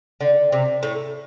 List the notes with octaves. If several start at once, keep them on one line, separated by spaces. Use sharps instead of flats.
D3
C3
A2